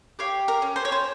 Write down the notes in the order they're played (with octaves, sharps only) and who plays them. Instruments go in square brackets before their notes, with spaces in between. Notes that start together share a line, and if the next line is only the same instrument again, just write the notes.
[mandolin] G4 C#5 F5
A#4
C#4
C5
C#5
C5